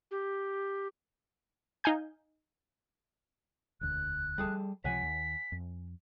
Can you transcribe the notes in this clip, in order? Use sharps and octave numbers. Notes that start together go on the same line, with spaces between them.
G4
D#4 F5 G#5 G6
E1 D2 F#6
G3 G#4 A4
C#2 C3 F3 C#5 F#5 G#5 B6
D#2
F2